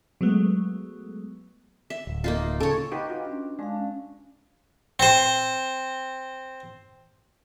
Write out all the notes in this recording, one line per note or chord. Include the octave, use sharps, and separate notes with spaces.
F#3 G#3 A3 B3
E5
D1
A#3 D#4 F4
C#3 A4 C#5
D#4 G4 B4
F4 F#4
C#4 D4
G#3 D4 F5
C#4
C4 C5